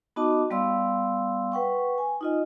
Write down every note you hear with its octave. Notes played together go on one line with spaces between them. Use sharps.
B3 D#4 F#4 D#5 A5 D6
G3 B3 D5 F5 C6 E6
B4 F#5 G5 C#6
G#5
D#4 F4 D#5